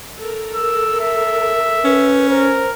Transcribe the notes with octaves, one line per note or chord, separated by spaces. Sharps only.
A4 A#4
E6
E5
C#4 B4
A#4 C5